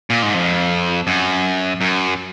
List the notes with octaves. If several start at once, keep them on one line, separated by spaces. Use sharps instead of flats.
A#2
G#2
F2
F#2
F#2